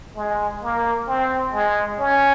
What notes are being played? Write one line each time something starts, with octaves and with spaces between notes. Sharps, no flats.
G#3
A#3
C4
G#3
C#4